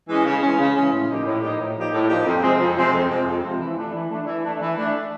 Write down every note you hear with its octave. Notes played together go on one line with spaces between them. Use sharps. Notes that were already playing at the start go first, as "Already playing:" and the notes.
E3 G#3 C#4
C#3
E3 G#3 C#4
C#3
E3 G#3 C#4
A2
F3 A#3 D#4 G4
A2
F3 A#3 D#4 G4
A2
F3 A#3 D#4 G4
A2
F3 A#3 D#4 G4
F2
C3 F3 G#3 C4
F2
C3 F3 G#3 C4
F2
C3 F3 G#3 C4
F2
C3 F3 G#3 C4
E3
A3 D4
E3
A3 D4
E3
A3 D4
E3
A3 D4